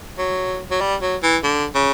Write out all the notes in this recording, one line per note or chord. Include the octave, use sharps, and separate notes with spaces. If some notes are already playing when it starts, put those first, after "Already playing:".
F#3
F#3
G3
F#3
E3
D3
C#3